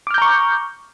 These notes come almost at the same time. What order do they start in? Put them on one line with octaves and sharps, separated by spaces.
D6 F6 G6 A#5 C#6